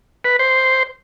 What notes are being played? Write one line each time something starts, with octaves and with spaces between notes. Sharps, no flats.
B4
C5